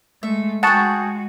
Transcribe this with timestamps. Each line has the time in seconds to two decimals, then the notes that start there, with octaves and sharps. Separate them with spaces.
0.23 G#3 A3 E5
0.63 G#3 F#4 G#4 F#5 G5 A5 C#6